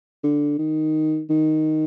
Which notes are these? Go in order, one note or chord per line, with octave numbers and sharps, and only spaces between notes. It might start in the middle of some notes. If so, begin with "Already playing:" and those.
D3
D#3
D#3